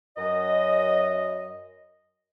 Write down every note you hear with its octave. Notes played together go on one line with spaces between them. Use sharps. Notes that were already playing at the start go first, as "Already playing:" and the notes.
F#2 D#5